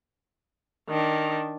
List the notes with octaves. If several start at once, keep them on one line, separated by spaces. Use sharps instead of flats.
D#3 D4